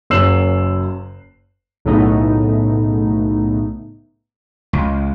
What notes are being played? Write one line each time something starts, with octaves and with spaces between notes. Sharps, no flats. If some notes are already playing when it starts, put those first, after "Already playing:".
F#1 F#2 E6 C7 E7 F#7
B1 A2 C#3 A3 B3 D#4
C#2